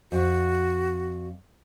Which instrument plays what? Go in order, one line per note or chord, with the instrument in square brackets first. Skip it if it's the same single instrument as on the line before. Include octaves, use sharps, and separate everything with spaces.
[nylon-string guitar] F2 [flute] F#4